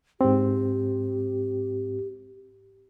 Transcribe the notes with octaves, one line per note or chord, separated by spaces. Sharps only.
G#2 C4 G4